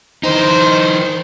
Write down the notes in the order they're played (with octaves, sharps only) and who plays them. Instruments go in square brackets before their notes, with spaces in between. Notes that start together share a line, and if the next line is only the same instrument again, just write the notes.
[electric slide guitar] E3 D#4 [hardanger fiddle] C5